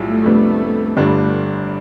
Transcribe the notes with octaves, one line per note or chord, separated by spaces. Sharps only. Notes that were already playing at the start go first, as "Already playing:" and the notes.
Already playing: B1 A2 G3 A3 F4
F2 C3 G3 B3 D4
G1 G2 D3 G3 D4